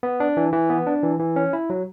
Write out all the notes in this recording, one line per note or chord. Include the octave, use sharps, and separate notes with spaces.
B3
D4
E3
E3
B3
D4
E3
E3
C#4
E4
F#3